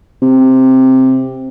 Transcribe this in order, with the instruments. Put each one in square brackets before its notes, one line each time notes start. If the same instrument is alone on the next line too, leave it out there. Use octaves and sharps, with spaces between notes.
[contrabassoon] C3